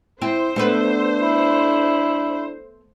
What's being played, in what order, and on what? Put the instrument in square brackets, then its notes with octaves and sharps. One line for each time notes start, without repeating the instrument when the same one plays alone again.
[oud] C4 [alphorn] E4 [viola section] C5
[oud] A3 B3 B4 [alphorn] D4
[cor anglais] E4